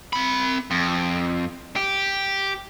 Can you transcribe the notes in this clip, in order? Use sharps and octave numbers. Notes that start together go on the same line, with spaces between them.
C4 B5
F2
G4